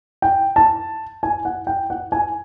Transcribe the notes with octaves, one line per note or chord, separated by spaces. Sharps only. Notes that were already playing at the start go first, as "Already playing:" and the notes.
G5
A5
G#5
F#5
G5
F#5
G#5